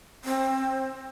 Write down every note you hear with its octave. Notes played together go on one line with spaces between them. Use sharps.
C4